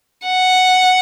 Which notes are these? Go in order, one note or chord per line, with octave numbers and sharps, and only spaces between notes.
F#5